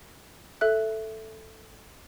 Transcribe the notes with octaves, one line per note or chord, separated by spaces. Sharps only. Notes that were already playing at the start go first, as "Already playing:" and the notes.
A4 E5 F#6